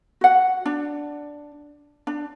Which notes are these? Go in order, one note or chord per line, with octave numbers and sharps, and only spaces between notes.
F#4 F#5
D4
D4